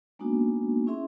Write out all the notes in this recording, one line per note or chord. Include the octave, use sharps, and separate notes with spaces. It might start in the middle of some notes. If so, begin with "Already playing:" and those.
G#3 A#3 B3 D4 D#4 F#4
C#4 E4 G#4 E5 C6